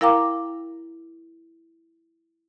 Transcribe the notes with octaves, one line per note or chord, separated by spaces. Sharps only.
E4 A#4 F5 G5 A#5 D6